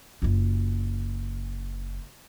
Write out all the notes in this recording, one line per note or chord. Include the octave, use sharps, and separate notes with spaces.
F#1 F4